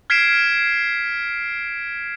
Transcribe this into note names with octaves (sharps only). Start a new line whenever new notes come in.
F6 G#6 B6 C7 D7 E7